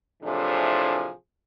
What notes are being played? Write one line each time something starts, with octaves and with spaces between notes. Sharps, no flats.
A2 C3 E3 F3 D4 G#4